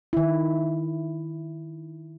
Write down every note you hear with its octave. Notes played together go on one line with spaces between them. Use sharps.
D#3 E4